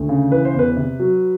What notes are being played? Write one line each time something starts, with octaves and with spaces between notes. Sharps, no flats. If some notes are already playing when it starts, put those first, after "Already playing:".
Already playing: D2
C#3
E3 B4
C5
E2
B4
C3
F#3